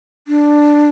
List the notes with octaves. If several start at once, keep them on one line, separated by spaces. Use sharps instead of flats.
D4